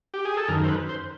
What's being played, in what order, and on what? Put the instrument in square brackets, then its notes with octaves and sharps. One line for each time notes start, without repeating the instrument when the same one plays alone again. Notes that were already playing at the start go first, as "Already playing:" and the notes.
[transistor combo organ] G4
G#4
A4
F#2 D#3 A#4
C5
B4
C5